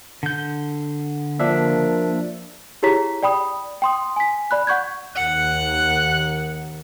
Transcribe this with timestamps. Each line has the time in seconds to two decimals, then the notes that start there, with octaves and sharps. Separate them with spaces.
0.23 D3 G6
1.40 F3 A#3 D4 E5
2.83 E4 G4 G#4 C#5 A#5 B6
3.23 D5 G5 B5 D#6
3.82 G5 C6 D#6
4.16 G#5 B6
4.51 D5 B5 F#6
4.67 F#5 C#6 G6 G#6
5.16 D#2 D#3 F#5 F#6